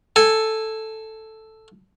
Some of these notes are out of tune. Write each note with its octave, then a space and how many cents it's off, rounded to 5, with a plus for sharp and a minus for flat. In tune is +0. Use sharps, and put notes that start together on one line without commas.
A4 +0 G#5 -15